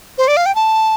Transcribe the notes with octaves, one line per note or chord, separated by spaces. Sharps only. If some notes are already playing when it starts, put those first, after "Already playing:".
C5
D5
F5
G5
A5